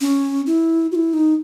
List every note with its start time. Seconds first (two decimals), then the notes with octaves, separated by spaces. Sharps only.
0.01 C#4
0.46 E4
0.92 F#4
0.95 E4
1.13 D#4